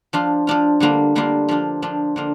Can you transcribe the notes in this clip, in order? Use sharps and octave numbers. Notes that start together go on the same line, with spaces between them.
F3 D4 F4
F3 D4 F4
D3 G3 A#3 D4 F4
D3 G3 A#3 D4 F4
F3 D4 F4
F3 D4 F4
D3 A#3 D4 F4